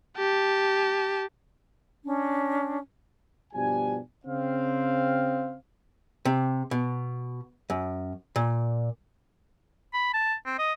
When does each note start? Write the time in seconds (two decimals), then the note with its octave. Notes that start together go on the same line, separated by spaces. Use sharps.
0.18 G4 A5
2.05 C#4 D4
3.54 G2 B2 F3 D4 G4 G#5
4.26 C#3 C4 F5
6.25 C3
6.71 B2
7.70 F#2
8.36 A#2
9.93 B5
10.13 A5
10.46 C4
10.59 D#5